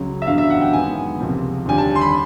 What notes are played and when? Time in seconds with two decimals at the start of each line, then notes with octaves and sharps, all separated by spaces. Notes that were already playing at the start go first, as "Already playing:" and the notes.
Already playing: C#2 C#3 F#3
0.22 E5
0.26 A1 G2 D3 F#3 B3 F5
0.38 E5
0.50 F#5
0.61 G5
0.73 F#2 D#3 G#3 B3 G#5
1.20 C#2 C3 F3 A#3
1.66 D#2 D3 G3 G#5
1.78 A5
1.95 C6
2.01 B5